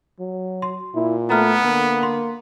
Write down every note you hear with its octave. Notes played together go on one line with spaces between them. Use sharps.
F#3
C6
A#2 E4
A3 B3 A#5 F6
D3 A#3
C6